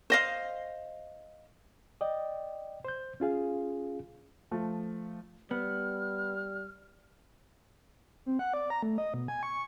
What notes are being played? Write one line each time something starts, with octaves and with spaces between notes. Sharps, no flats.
C5 D#5 F5
D5 D#5 G5
C5 G6
C#4 F4 G#4 F5
F3 A3
G3 B3 F6
C4
F#5
D5
A#5
A3
D#5
B2
G#5
C#6